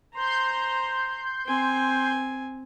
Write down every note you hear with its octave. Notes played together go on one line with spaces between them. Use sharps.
C5 A#5 C6 G6
C4 G#5